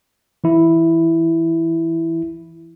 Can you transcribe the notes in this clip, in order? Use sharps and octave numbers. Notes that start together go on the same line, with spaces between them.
E3 E4